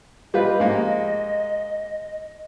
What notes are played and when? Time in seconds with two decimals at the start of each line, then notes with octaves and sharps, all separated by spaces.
0.34 G3 F4 B4 D#5
0.60 G#2 A#3